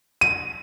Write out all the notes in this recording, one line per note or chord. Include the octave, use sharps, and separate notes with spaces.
D#7